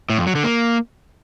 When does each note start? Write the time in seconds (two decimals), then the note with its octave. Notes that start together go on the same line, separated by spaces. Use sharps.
0.10 A2
0.18 F2
0.27 F#3
0.35 D3
0.44 A#3